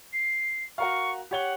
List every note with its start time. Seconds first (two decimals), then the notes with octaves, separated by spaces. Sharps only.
0.13 C7
0.78 F#4 A#4 F5 C#6
1.31 G4 C#5 F#5 G7